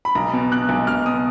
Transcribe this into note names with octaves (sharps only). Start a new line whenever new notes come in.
B5
B1 A#5
B2
B2 F#6
B1
B1 F6
B2 D#6